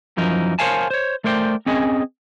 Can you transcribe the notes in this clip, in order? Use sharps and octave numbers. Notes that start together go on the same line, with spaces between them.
F#2 E3 F3 D#4 A#4
A#4 C5 C#5 F5 G#5 A5
C5 C#5
A3 A#4 C5 D5 G5
C4 C#4 G#4 D#5